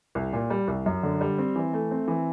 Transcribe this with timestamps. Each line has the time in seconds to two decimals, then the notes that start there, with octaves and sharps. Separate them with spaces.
0.15 C2
0.33 A#2
0.50 G3
0.68 C2
0.86 F#2
1.03 D3
1.21 G3
1.38 C4
1.56 E3
1.73 A3
1.91 C4
2.08 E3